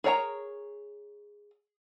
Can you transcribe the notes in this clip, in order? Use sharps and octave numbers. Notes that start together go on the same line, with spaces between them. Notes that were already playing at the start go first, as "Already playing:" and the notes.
G#4 A#4 C#5 G#5 A#5